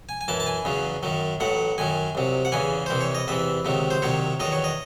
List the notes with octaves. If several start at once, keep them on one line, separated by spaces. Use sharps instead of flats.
G#5
G#5
F#2 E3 A5
A5
G#5
E2 C#3 F#3
F#2 D#3 F#3
A1 A2 F#3 F#5
F#2 D#3 F#3 G#5
C2 C3 F#3
F#5
E2 C#3 E3 G#5
C2 C3 E3 C5
C#5
D#5
E2 C3 E3 E5
C#2 C3 D#3 F#3
C5
C2 C3 D#3 F#3 C#5
E2 D#3 F#3 D#5
C#5
D#5